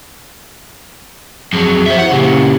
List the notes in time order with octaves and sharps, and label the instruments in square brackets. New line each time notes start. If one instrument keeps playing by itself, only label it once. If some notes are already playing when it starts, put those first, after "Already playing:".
[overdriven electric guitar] F2 F#3 [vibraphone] G#4
[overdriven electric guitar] C5 E5
[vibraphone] E4 G4 [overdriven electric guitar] F#5
[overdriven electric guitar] A#2 C#3